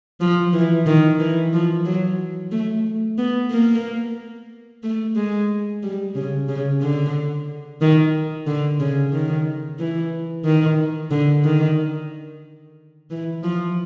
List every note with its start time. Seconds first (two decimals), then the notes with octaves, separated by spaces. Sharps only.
0.21 F3
0.53 E3
0.86 D#3
1.20 E3
1.53 F3
1.85 F#3
2.52 A3
3.18 B3
3.51 A#3
4.83 A3
5.16 G#3
5.83 G3
6.15 C#3
6.49 C#3
6.81 D3
7.81 D#3
8.47 D3
8.80 C#3
9.13 D#3
9.79 E3
10.45 D#3
11.11 D3
11.44 D#3
13.10 E3
13.43 F3